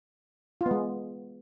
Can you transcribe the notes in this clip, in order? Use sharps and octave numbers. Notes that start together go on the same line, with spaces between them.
F4
B3
G#3